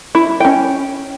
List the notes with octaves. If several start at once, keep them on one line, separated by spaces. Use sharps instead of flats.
E4
C#4 G5